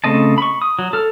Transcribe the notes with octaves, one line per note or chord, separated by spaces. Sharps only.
C#3 A3 C4 D#5 A5
B5 C#6
D#6
F#3
A4 F6